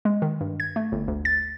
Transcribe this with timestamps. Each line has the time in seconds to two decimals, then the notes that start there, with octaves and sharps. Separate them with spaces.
0.05 G#3
0.22 D#3
0.41 G2
0.60 G#6
0.76 A3
0.92 G1
1.08 D2
1.25 A6